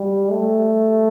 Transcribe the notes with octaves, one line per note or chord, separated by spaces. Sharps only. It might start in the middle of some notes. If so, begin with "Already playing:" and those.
Already playing: G3
A3